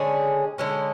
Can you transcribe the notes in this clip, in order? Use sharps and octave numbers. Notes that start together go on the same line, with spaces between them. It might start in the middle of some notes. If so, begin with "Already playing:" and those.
Already playing: D3 G#3 C#4 G#4
D3 G#3 C#4